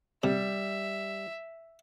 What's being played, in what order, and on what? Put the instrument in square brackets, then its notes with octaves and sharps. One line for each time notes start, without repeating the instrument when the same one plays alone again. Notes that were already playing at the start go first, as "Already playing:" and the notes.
[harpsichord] C3 [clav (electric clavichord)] G3 [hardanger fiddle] E5